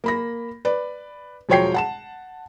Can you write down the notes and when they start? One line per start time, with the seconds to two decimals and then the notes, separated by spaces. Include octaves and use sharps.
0.04 A#3 B5 A#6
0.65 B4 D5
1.49 E1 F3 F#3 C#5 G5 C7
1.74 F#5 A5 E7